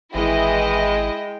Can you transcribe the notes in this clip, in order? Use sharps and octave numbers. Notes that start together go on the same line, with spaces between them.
G#1 E3 G#3 E4 D#5 G5